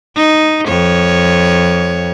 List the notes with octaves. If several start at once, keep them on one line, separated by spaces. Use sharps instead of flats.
D#4
F2 C#5